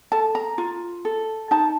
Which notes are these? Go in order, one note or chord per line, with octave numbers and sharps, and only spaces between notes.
A4 A5
A#5
F4
A4
D#4 A5